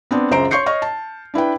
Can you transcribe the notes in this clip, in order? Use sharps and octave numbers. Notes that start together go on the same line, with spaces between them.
B3 C4 D4
C#2 F#2 C5 A#5 D7
C#5 C6 C#6 G6 C7 C#7
C#5 D#5 C#6 F6
A5
D4 E4 B4 G5